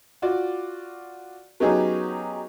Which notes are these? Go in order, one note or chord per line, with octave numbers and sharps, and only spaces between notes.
F4 F#4 D5
F#3 B3 C#4 D#4 G4 G#4